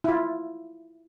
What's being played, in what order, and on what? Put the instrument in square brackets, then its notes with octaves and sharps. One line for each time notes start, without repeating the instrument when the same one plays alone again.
[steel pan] E4 F4